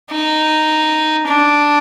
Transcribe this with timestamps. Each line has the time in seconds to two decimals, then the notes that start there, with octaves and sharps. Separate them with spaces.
0.11 D#4
1.27 D4